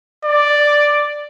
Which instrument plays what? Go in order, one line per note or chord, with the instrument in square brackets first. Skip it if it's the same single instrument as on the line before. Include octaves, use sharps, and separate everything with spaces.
[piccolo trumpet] D5